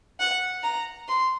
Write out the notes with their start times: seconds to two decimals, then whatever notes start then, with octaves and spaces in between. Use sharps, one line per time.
0.20 F#5
0.63 A#5
1.08 C6